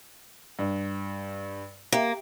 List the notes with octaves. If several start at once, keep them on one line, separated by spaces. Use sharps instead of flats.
G2
A#3 G4